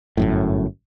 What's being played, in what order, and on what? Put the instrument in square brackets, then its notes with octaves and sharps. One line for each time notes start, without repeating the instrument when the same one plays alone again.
[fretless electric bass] G1 F#2 A2